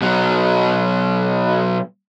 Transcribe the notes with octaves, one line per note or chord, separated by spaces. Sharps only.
B2 F#3